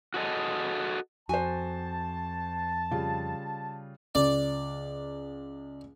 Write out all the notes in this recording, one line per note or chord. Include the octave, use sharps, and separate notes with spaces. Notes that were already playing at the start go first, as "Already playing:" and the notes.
F#4 G#4 A4 D#5
F2 F#4 C5 G#5 A5
C#3 G3 F4
C#2 D5